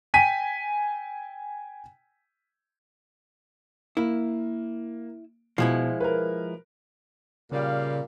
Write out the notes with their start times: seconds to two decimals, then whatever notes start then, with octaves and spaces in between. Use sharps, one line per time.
0.14 G5 G#5 B6 D#7
3.97 A#3 E4
5.58 B2 F3 G#3 E4
6.00 A#4 B4
7.52 A#2 C#3 G3 F5